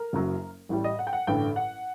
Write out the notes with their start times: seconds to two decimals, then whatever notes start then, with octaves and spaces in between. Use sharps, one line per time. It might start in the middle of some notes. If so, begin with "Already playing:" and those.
Already playing: A#4
0.13 F#1 F#2 F#3
0.69 A1 A2 G3
0.84 D#5
0.99 F#5
1.07 G5
1.13 F#5
1.27 A1 G2 D3 G5
1.56 F#5